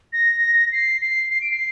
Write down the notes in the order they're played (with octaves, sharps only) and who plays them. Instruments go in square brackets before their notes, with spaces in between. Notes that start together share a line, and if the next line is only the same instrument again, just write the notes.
[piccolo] A#6
C7
C7
C7
D7
C7